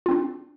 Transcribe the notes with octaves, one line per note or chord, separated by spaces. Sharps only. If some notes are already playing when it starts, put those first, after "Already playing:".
C4 D4 F4